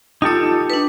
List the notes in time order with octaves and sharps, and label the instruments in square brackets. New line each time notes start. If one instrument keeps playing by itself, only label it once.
[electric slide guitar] D#4 G4 A4 [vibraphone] F4 D#6
[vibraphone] D4 B4